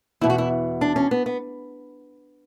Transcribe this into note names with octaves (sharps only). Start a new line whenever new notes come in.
E2 B2 E4
F#4
E4
D4
C#4
B3
B3